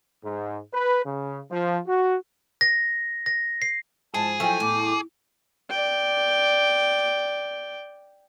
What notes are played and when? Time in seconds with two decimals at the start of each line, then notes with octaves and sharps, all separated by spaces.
0.25 G#2
0.73 B4
1.06 C#3
1.51 F3
1.87 F#4
2.61 A#6
3.26 A#6
3.62 C7
4.14 G#2 F3 E4 G#4 A5
4.40 F3 F#3 A3 E4 G5 G#5
4.60 E2 A2 D6
5.70 D5 G5